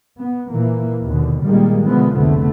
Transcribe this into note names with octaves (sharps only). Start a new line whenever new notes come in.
B3
A#2 E3 A#3
D#2 B2 D3
A#2 D#3 G3 G#3 A#3
B2 D3 E3 F3 G#3 B3
F1 C#2 D3 A3 B3